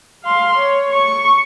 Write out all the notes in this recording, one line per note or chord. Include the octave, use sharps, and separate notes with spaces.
F5 C6
C#5
C#6